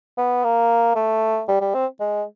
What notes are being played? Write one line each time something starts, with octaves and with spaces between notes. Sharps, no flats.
B3
A#3
A3
G3
G3
C4
G#3